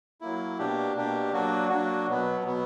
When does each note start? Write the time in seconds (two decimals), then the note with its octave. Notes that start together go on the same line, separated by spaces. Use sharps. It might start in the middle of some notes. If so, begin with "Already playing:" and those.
0.21 F#3 A#3 E4
0.58 B2 A#3 D4 G4
0.95 B2 A#3 D4 G4
1.32 F#3 A#3 D4 F#4
1.69 F#3 A#3 D4 F#4
2.07 B2 F#3 B3
2.44 B2 F#3 B3